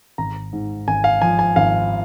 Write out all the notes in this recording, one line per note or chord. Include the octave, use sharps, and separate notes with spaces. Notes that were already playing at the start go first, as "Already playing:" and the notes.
G#1 A#5
G#2
G#1 G#5
F5
F3 G#5
G#5
G#1 F5